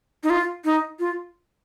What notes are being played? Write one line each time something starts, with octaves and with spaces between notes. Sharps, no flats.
D#4
F4
D#4
F4